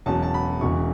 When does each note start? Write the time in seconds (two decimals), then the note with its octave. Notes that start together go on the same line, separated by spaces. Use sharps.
0.06 E1 E2 B2 F#3 C#4 A5
0.22 A5
0.34 B5
0.61 E1 E2 C#3 E3 C#6